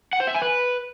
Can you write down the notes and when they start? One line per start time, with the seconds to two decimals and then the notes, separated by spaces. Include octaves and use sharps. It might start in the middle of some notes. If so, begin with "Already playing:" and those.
0.13 F#5
0.20 C5
0.27 E5
0.35 G#5
0.42 B4